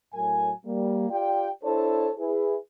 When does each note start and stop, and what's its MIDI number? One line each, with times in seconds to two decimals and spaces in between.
0.13 0.52 45
0.13 0.52 54
0.13 0.52 70
0.13 0.52 80
0.66 1.08 55
0.66 1.08 58
1.10 1.49 65
1.10 1.49 67
1.10 1.49 74
1.10 1.49 79
1.64 2.10 62
1.64 2.10 64
1.64 2.10 69
1.64 2.10 72
1.64 2.10 73
1.64 2.10 81
2.19 2.57 64
2.19 2.57 68
2.19 2.57 71